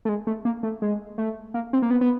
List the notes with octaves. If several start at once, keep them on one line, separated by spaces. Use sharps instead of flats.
A3
G#3
A3
A#3
A3
G#3
A3
A#3
C4
A#3
B3
B3